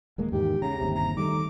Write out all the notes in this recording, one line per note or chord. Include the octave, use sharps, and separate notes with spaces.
D#1 G#3 A#3
E2 G#2 D#3 G4
C#3 A#5
G1 D#2 C3
A#5
D#3 G3 A3 D6